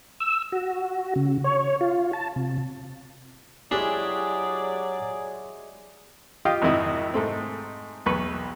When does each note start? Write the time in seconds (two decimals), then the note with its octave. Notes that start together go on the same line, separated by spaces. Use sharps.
0.20 E6
0.52 F#4
1.16 C#3
1.44 C#5
1.81 F4
2.13 A5
2.36 C3
3.71 F#3 G#3 D4 E4 G4 G#4 C#5 D5
6.45 F4 G4 D#5 F5 G5
6.62 G#1 F2 C3 D#3 E4 D#5
7.14 G#2 A3 C4
8.06 B1 E2 B4 C#6